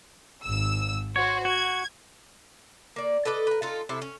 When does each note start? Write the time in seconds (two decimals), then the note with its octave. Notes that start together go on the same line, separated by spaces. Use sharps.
0.43 G#1 E6
1.16 F#4 C5 C#5
1.45 F#4 G#6
2.96 A#3 D5
3.25 A4 B4 D5 D#5
3.47 A#4 B4
3.62 D#4 F4 A4
3.89 C3 E4 A4
4.02 C#4